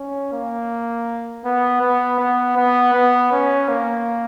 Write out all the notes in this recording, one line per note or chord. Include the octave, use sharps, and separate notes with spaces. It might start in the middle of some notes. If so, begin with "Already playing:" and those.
Already playing: C#4
A#3
B3
B3
B3
B3
B3
C#4
A#3